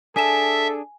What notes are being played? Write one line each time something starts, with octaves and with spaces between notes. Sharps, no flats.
D4 G#4 A4 E5 G#5 E7